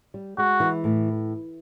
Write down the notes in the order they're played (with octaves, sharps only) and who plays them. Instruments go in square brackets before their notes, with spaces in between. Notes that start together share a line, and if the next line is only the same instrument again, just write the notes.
[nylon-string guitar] G3
[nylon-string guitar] G#3 [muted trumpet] F#4
[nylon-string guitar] E3
A2